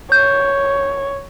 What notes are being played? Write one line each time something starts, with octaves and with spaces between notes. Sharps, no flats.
C#5 G6